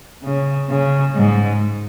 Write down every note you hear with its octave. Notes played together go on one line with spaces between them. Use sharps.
C#3
C#3
G#2